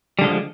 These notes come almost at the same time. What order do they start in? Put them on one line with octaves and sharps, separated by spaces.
G3 D3 G#3 F3